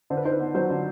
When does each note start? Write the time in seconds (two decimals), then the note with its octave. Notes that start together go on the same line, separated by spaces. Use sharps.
0.10 D3 C5
0.17 B4
0.25 D#4 C5
0.32 B4
0.40 B3
0.55 F#3 C5
0.70 D3